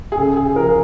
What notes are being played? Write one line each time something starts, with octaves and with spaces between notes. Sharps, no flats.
G#4
C#3 A4
G#4
F3 A#4